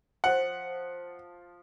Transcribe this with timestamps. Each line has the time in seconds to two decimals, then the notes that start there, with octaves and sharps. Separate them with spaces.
0.24 F3 F#5